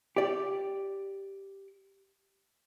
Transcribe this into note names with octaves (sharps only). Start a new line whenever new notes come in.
G4 D5